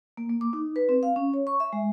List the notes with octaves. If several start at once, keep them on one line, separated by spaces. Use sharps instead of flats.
A#3
A#3
D6
D#4
B4
C4
F5
C#4
C#5
C#6
E5
G#3